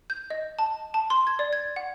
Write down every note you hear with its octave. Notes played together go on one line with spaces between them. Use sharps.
G6
D#5
A5
A5
C6
G#6
D5
G#6
F#5